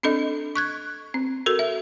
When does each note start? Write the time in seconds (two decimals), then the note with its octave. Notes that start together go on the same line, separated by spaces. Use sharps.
0.03 C4 D4 A4 D#5
0.56 C#6 F#6 G#6
1.14 C4
1.46 F#4 A4 A#4
1.59 E5